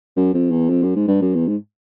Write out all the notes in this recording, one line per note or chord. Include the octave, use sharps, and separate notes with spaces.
F#2
F2
E2
F2
F#2
G#2
G2
F#2
E2
G#2